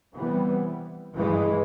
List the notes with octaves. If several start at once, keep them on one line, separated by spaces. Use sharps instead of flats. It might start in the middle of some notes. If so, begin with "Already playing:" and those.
C3 E3 G3 B3
G2 E3 G#3